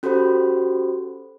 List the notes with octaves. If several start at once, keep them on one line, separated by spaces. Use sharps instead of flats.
C#4 F#4 G4 A4 C5 B5